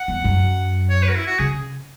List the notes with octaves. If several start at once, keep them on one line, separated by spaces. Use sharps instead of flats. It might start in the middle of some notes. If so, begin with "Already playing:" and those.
Already playing: F#5
E2
F#2
C#5
B4
F#4
E4
F#4
C#3 G#4